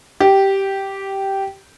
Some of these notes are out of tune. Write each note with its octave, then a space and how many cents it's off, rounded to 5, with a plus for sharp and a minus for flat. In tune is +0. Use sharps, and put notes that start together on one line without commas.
G4 -10